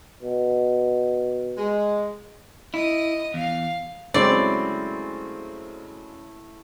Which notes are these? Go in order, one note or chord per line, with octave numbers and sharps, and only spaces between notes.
B2
G#3
E4 D#5 D#6
E2 F5
C#3 F#3 G#3 A3 C4 E4 D5